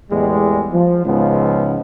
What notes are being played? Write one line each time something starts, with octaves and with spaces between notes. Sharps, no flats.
E2 A2 G3 G#3
F3
C#2 G#2 F3 G#3 B3